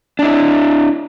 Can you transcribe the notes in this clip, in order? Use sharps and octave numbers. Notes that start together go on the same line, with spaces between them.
D4 E4